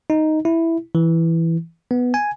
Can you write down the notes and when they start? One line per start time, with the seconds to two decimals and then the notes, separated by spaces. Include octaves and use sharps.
0.10 D#4
0.45 E4
0.95 E3
1.91 B3
2.14 G#5